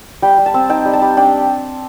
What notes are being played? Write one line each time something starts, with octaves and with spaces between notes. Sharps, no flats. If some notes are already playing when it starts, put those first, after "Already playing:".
G3 G5
G3
A5
C4
D#4 G5
G3
A5
G3
D4 G5